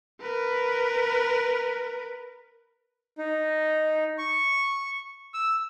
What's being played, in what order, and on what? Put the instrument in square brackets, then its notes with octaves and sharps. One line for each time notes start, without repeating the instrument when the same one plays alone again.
[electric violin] A#4 B4
[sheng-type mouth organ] D#4
C#6
E6